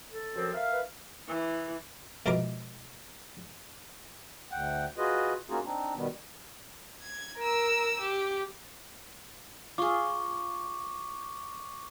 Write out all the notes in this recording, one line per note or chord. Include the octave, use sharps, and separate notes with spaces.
A4
F#2 F3 C4
A#4 E5 F5
B4
E3
F2 B2 E3 G#3 A#4 D6
D2 F#5 G5
F4 F#4 G#4 B4 D#5
A#3 C#4 D#4 F4 F#4 G#4
C4 D4 D#4
B2 D#3 G3 B3
G#6
A#4 E6
G4
F4 G#4 C#6 D6